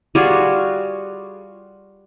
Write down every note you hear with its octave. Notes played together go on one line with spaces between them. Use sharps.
G3 F4 F#4 G#4